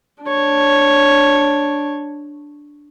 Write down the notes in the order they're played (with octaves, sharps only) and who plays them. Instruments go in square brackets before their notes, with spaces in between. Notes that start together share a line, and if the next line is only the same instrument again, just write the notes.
[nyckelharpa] D4 C#5